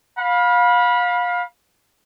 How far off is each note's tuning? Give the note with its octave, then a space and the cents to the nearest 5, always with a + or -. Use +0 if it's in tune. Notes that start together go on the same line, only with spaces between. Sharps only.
F5 +30 B5 -20